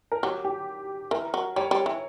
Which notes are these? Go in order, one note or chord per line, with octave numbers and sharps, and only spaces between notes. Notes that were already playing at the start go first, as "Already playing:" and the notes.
A#4
F#3 G4
G4
E3 A#4
F#3
G3 C#5
G3
E3